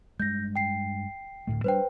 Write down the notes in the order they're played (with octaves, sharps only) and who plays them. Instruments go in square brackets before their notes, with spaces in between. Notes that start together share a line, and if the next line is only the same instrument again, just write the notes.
[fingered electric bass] G2 G#3 [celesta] G6 A#6
[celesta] G5 C7
[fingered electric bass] D2 A2 A3
[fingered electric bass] G3 C#4 D4 [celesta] B4 C5 G5